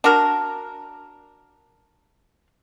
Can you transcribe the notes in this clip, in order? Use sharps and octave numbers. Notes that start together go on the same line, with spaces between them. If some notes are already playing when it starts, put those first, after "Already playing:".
D4 F#4 A#4